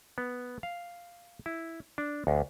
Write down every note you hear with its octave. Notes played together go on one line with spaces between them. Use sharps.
B3
F5
E4
D4
D2